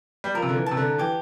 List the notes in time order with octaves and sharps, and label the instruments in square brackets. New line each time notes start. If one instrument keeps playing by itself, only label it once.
[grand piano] G3
[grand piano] F3 [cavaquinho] A#4
[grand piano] C3
D3
E3
[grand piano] C3 [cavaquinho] A5
[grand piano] D3
[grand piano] E3 [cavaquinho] G4